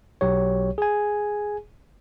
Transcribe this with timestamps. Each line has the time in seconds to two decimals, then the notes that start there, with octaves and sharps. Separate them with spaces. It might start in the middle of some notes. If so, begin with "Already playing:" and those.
0.21 B1 F#3 G4 C#5
0.78 G#4 G#5